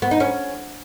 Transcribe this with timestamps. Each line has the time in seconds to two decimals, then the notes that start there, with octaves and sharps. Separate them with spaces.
0.02 B3
0.11 D#4
0.20 C#4